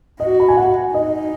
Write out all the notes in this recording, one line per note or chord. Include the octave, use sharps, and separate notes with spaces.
F#4 D#5
B5
G#5
F#5
D#4 D#5